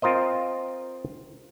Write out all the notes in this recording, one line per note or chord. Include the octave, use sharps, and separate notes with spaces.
C4 F4 A#4 C5 D#5